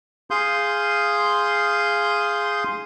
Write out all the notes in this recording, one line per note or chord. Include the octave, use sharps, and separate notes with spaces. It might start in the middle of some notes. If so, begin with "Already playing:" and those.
G#4 F5 C6 D#6 G6